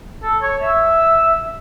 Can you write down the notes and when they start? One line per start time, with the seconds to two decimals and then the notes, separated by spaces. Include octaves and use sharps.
0.23 A4
0.42 C#5
0.62 E5